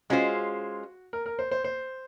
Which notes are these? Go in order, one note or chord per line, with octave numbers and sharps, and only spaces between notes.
G#3 C#4 F4 F#4 C5
A#4
A#4
C5
C5
C5